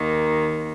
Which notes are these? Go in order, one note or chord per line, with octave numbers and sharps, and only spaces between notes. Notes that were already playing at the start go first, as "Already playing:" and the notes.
Already playing: D#2 D#3 A#3